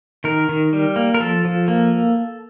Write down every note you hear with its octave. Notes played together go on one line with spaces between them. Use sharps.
D#3 A#4
D#3
G3
A#3
A#4
F3 A4
F3
A#3